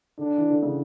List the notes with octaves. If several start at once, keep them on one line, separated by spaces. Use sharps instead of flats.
D3 D4
E3
D3
C#3